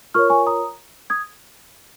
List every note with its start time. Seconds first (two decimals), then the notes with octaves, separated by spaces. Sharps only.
0.14 F4 A#4 C#5 C#6 F6
0.30 G#5 C#6
0.47 A#5 D#6
1.10 D#6 G#6